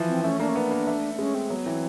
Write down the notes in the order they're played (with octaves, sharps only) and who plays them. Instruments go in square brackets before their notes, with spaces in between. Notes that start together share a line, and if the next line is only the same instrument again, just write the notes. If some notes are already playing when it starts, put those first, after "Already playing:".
Already playing: [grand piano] E3 F3
[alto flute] C4
[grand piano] A3 [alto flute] C#4
[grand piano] A#3 [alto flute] D4
[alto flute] C#4
[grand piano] B3 [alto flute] D4
[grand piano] A#3
A3
[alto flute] D4
[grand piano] G#3 [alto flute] C#4
[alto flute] C4
[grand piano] F#3 [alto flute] B3
[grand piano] E3 [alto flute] C4